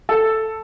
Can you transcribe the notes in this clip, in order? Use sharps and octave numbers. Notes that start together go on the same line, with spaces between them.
A4